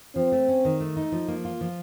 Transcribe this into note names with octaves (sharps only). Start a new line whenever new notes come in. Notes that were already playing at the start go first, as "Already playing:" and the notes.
F3 C4
A3
C#4
D#3
A3
D#4
F3
A#3
F4
F3